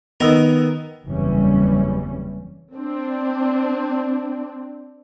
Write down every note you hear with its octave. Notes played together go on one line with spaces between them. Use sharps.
D#3 B3 A#4 E6
F#1 E2 C3 E3 G3 C#4
C4 D4